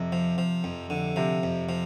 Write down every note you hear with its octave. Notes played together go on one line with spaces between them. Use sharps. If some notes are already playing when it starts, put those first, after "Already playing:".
Already playing: F2 C3
F3
F3
F2
D3
C3 F3
F2
F3